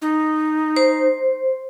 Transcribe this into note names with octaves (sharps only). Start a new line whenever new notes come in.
D#4
C5